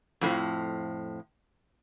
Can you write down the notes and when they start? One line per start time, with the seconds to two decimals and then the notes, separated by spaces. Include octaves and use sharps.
0.21 F2 A2 E3 F3